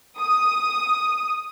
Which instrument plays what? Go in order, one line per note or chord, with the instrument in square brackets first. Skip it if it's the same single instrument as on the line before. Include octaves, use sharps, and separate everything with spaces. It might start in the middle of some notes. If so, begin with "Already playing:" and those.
[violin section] D#6